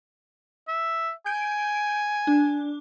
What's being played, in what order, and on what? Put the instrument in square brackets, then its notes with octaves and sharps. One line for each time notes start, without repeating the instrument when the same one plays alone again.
[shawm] E5
[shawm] G#5 [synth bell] G6 D7
[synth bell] D4